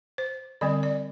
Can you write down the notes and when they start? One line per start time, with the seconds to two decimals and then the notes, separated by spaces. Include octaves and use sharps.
0.18 C5
0.61 D3 G3 C4 D5
0.83 D5